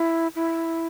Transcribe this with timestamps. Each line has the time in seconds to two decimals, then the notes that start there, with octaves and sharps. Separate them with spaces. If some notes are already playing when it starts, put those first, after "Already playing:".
Already playing: E4
0.35 E4